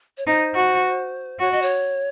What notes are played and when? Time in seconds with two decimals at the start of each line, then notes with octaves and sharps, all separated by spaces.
0.18 C#5
0.26 D#4 C5
0.55 F#4
1.39 F#4 C#5
1.51 D#5
1.62 C#5